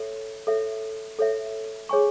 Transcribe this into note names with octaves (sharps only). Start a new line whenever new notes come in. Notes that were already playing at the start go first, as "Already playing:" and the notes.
Already playing: A4 C#5 E5
A4 C#5 E5
A4 C#5 E5
G#4 C#5 G#5 C#6